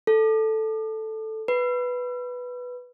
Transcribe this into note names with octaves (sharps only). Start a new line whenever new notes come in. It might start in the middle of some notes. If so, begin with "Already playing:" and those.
A4
B4